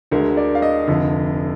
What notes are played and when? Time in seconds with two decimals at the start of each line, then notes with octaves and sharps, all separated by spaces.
0.11 D2 D3 G#3 A#4
0.37 D5
0.55 F5
0.62 D#5
0.88 F1 F2 D3